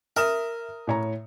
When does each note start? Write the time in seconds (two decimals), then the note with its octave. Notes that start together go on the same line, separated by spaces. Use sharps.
0.17 A#4 E5 D#6 E7
0.87 A2 C#5 A#5